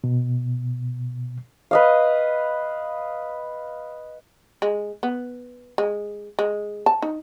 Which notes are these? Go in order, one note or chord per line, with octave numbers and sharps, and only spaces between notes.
B2
B4 D#5 F5
G#3
B3
G#3
G#3
A5
D#4